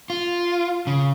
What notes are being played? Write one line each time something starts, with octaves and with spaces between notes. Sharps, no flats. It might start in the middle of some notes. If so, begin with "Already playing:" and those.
F4
C#3